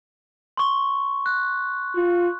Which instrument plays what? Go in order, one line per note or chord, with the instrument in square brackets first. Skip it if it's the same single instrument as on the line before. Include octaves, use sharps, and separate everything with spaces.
[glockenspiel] C6 C#6
F#6
[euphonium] F4